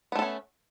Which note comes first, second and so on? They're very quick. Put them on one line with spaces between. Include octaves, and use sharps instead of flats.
B3 A3 A4 C#4